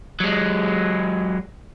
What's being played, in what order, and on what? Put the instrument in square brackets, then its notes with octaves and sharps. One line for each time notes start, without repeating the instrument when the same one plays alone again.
[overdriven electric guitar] F#3 G#3